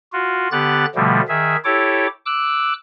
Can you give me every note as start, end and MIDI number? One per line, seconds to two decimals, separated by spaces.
0.13 0.48 65
0.13 0.48 66
0.51 0.85 50
0.51 0.85 59
0.51 0.85 67
0.51 0.85 90
0.51 0.85 93
0.95 1.21 47
0.95 1.21 50
0.95 1.21 53
0.95 1.21 55
0.95 1.21 57
1.28 1.56 51
1.28 1.56 68
1.28 1.56 76
1.64 2.07 64
1.64 2.07 67
1.64 2.07 69
1.64 2.07 73
1.64 2.07 86
2.26 2.73 86
2.26 2.73 88
2.26 2.73 90